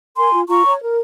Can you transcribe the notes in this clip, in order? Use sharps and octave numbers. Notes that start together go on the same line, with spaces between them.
A#4 G#5 C6
F4
F4 A#5 C#6
C#5
A#4